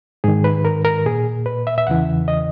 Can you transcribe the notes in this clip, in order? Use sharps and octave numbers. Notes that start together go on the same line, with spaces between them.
G#2 D#3 G#4
B4
A#4
A#4
A#2 G#4
B4
E5
E5
E2 C#3 E3 F#5
D#5